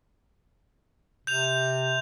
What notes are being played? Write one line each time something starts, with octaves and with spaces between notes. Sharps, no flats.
C3 G6 F7